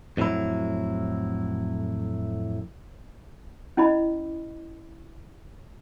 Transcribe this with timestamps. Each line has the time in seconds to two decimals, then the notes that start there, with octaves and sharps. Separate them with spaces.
0.17 F2 A2 F3 F#3 E4
3.77 C#4 E4 D#5 B5